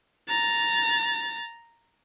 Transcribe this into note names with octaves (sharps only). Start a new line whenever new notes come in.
A#5 A6